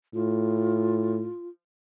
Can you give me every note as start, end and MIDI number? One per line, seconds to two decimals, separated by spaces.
0.14 1.27 45
0.14 1.48 65